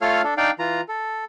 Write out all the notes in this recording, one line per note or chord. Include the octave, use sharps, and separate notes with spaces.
A3 F4 A4 C#5 F5 F6
D4 A4
D4 D#4 D5 F5 G5
E3 F4 A#5
A4